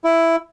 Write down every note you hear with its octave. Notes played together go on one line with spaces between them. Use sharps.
E4